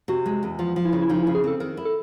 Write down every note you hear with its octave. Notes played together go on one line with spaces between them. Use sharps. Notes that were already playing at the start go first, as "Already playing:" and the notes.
C3 F#4
G#3
E2
F3 F4
F3
E4
C#3
E4
F3 D#4
E4
C#3
G#4
C4 A4
D#3 A#4
E4
A4